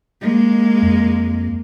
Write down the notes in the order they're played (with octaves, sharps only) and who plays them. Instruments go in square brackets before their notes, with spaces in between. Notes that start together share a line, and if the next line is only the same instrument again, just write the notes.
[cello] G#3 A#3
[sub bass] F2